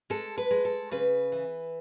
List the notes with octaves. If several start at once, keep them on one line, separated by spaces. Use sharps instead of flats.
G#3 A4
B4
G#3
A4
C#3 B4
E3